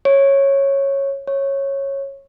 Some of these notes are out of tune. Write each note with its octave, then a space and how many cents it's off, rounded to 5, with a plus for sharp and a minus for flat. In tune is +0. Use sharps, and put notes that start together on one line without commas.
C#5 -10
C#5 -15